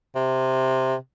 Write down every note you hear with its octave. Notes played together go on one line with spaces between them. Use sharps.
C3